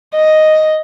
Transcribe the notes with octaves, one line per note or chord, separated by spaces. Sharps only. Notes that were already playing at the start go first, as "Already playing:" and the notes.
D#5